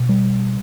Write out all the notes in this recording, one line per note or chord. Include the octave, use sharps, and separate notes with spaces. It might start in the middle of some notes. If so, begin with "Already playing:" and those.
Already playing: B2
G3